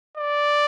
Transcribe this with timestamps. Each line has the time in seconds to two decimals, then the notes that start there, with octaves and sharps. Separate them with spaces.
0.17 D5